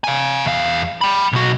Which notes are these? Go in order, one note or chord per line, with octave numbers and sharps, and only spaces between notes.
F5 G#5
E2 F5
G5 B5
B1 F#4